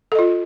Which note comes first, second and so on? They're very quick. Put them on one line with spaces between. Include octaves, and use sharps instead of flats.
A4 D#5 F4